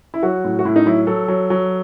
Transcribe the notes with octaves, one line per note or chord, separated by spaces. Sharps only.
E4
F#3 F#4
A2
F#4
A2 E4
D#4
F#3 E4
F#3 A4
F#3
F#3